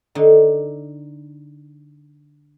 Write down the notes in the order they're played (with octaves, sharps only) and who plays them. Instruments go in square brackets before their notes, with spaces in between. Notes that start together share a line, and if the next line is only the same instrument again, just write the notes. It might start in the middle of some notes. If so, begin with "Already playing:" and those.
[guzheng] D3 D#4